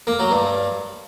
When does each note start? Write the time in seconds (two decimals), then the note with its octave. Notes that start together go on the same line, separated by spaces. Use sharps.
0.07 A#3
0.19 F#3
0.31 G2